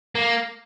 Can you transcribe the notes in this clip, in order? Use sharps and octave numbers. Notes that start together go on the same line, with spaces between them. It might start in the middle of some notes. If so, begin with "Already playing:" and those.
A#3